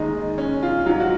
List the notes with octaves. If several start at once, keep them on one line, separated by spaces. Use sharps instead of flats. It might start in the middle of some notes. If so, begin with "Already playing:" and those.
Already playing: D#2 D#3 G#3 D#4
C#4
F4
G#2 F#3 F4
F#4